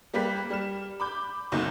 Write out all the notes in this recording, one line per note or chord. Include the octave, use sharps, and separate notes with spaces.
G3 A#3 G4 B4 B6
G3 F6 E7
B5 D6 G6
F#1 B1 C3 D#4 G6